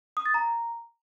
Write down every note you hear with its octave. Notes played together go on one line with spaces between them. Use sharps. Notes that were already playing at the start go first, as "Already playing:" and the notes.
D#6
A6
A#5